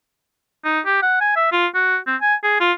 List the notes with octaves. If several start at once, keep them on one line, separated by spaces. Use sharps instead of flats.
D#4
G4
F#5
G#5
E5
F4
F#4
C4
G#5
G#4
F4